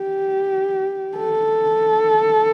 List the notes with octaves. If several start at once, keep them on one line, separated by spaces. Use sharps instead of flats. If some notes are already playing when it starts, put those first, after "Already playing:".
Already playing: G4
A4